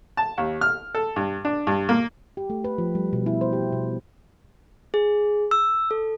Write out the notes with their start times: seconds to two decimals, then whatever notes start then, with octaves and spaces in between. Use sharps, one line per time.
0.17 A5
0.38 D#2
0.61 F6
0.95 A4
1.16 G2
1.45 D4
1.67 G2
1.89 A#3
2.37 G4
2.50 A3
2.64 B4
2.78 F3
2.95 G3
3.13 B2
3.26 E4
3.41 C5
3.53 G4
3.73 B2
4.94 G#4
5.51 E6
5.91 A4